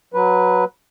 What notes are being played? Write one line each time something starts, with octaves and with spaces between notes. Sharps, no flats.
F#3 B4